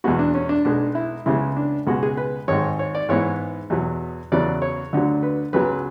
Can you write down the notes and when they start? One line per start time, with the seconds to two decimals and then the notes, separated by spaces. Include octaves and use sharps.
0.04 E2 B2 G#3 B3 F#4
0.19 D4
0.35 C#4
0.49 D4
0.65 B1 B2 G#3 B3 D4
0.95 E4
1.26 C#2 C#3 G#3 B3 E4
1.57 D4
1.87 C#2 B2 G#3 B3 F#4
2.03 G#4
2.17 B4
2.48 G#1 G#2 G#3 C#5
2.79 C#5
2.95 D5
3.09 G#2 E3 G#3 B3 C#5
3.70 E2 B2 F#3 B3
4.32 E2 C#3 F#3 B3 D5
4.62 C#5
4.93 D2 D3 F#3
5.23 B4
5.53 C#2 C#3 F#3 B3 B4